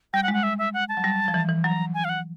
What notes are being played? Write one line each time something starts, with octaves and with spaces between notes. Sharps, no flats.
G3 G5
F#5
G#3
F#5
E5
E5
F#5
A5
F#3
G3
F3
E3
E3
F#3 A#5
G#5
F5
F#5